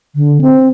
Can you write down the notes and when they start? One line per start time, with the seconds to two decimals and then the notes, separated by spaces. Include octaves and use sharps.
0.16 D3
0.41 C4